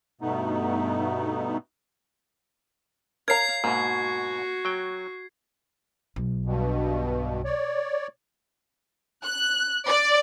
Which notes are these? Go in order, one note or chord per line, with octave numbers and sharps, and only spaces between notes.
G2 B2 A3 B3 D#4
A#4 C#5 F5 A#5 G#6 C7
G#2 B2 A#3 F#4 C#6
F#3 G5
B1
G2 B2
C#5 D5
F#6
D5